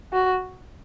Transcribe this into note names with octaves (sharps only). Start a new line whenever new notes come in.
F#4